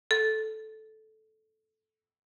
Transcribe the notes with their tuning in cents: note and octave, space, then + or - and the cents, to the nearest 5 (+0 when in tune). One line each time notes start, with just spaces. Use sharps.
A4 -10